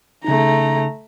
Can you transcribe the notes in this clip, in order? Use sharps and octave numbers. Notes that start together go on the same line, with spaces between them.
C#3 A3 D#4 A#5